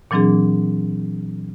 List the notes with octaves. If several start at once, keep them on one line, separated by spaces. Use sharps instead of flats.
A#2 E3 F#3 C4 D4 G#4